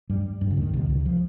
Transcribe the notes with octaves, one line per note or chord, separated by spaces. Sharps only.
G2 G3
G2 G3
C#3
D#2 D#3
C2 C3
C#2 C#3
F3